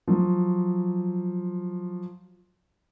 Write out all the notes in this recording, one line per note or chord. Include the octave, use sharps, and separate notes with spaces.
F3 F#3